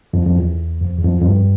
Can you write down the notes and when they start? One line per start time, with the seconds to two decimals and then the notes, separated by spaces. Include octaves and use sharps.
0.13 F2
0.26 F2
0.36 E2
0.81 F2
0.98 E2
1.03 F2
1.21 F2
1.26 G2